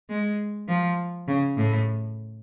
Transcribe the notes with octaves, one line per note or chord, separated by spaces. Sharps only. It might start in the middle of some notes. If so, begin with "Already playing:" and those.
G#3
F3
C#3
A2